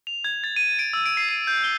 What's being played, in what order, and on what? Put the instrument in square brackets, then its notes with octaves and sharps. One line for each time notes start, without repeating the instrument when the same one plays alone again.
[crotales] F7
G#6
A6
D#7
D7
E6
D7
C7
D#7
G6
G7